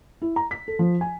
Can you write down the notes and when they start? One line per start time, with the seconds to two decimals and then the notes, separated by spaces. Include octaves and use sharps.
0.22 E4
0.36 A#5
0.51 B6
0.68 A4
0.79 F3
1.01 G#5